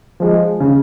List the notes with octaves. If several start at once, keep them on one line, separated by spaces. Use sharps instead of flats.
F3 G#3
C#3